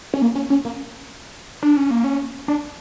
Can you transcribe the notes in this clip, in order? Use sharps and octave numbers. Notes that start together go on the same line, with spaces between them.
C#4
A#3
C#4
C#4
A#3
D4
C#4
A#3
C#4
D4